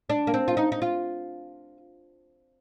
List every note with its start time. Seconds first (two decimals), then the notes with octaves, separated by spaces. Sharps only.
0.10 D4
0.27 A#3
0.34 C4
0.48 F4
0.57 D#4
0.72 D#4
0.82 F4